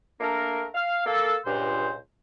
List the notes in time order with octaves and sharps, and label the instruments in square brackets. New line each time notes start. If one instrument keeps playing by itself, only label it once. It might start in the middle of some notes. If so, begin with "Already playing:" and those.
[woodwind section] A3 A#3 D4 A#4
F5
A#3 A4
C#2 G2 A#2 C5